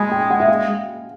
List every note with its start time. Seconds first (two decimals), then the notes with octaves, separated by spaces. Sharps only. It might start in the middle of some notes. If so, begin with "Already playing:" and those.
Already playing: G#3 G#5 B5 C6
0.12 G5
0.30 F#5
0.40 E5
0.48 F5